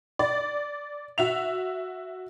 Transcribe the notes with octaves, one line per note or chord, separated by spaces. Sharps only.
D5
F#4 E5 F7